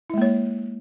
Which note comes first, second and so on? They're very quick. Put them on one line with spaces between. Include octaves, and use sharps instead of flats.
E4 G#3 A#3 C#5